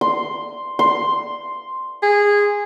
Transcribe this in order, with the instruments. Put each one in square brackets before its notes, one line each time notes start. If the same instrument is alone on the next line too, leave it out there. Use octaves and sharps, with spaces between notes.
[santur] C6
C6
[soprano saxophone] G#4